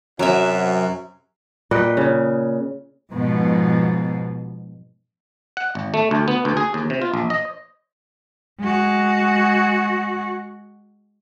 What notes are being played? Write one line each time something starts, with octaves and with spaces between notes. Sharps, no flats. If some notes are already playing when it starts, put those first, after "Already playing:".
F#2 C3 F#3 E5
A#2 B4 D#5 G5
C#3
G#2 B2 F3
F#5
G#1
A3
D2
B3
D2
G#4
D#2
C3
F4
A#1
D#5
G#3 F#4